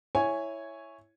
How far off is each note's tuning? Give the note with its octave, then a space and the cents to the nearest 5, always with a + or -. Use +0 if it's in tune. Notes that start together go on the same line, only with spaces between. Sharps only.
E4 +0 C#5 +0 G#5 -5